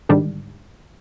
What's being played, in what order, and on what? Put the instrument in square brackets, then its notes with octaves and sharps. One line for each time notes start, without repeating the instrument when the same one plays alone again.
[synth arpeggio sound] G#2 D3 D#3 G3 D4